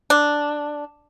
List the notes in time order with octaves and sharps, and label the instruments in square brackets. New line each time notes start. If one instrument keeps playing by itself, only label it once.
[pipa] D4